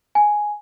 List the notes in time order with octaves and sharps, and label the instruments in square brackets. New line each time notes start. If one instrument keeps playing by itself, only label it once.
[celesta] G#5